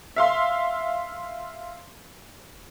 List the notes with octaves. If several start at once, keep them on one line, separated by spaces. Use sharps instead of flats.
E5 F5 C6